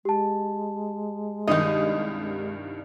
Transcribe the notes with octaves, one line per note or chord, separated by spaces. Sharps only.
G#3 G4 A5
C2 G2 D#3 D#4 D#5